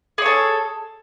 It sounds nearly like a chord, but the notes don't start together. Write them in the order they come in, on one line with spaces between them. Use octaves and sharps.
G#4 C#5 A4